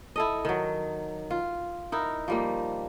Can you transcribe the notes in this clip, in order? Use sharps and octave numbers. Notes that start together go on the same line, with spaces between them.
E4 A4 D#5
D#3 F#3
F4
D#4 E4 A#4
F3 G3 A#3